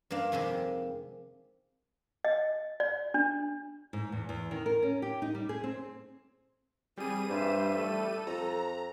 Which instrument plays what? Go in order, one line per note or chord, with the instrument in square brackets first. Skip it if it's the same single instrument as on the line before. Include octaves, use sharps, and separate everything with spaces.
[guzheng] G2 A#3 D4 F5
F2 C3 D#3 G#3 G4
[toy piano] D#5
D5
D4
[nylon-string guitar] G#2
E2
E2
D#3
A#4
C#4
G4
D#4
G3
G#4
C4
[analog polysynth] G3 D#7 [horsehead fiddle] C4 G#4
[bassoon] G2 [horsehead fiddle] C5 E5
[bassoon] A3 [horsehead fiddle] A4
[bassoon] F2 [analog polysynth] A#5